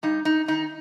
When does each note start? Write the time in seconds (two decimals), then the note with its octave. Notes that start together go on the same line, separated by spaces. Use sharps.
0.03 G2 D#4
0.25 D#4
0.48 D#3 D#4